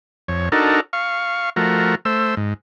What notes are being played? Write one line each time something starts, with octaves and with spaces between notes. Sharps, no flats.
F2 C#5
D4 D#4 F#4 A4 A#4
F5 C#6
F3 A3 F#4 A#4
A3 C5 E6
G#2